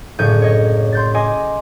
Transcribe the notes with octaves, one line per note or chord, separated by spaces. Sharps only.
F#1 A2 D3 C#6 G6 D#7
C#5 D#5
C6 G6 A6
D#5 G#5 C6 D6